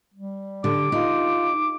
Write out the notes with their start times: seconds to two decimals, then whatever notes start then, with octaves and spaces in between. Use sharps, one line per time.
0.14 G3
0.64 D3 G4 D6
0.92 D#4 F4